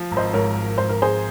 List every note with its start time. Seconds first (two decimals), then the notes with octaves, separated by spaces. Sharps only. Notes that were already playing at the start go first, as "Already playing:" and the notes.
Already playing: F3
0.11 G#1
0.17 C5 D#5
0.33 G#2 A#4 C#5
0.56 G#1
0.78 G#1 C5
0.89 A#4
1.00 G#1 G#4 C5